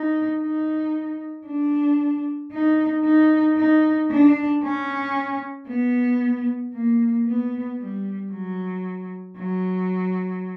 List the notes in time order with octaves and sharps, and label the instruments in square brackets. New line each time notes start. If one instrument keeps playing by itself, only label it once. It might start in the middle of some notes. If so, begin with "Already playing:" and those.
Already playing: [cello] D#4
D#4
D4
D#4
D#4
D#4
D4
C#4
B3
A#3
B3
G3
F#3
F#3